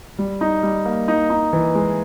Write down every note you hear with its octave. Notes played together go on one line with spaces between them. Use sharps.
G3
D#4
G3
A#3
D#4
D#4
E3
G#3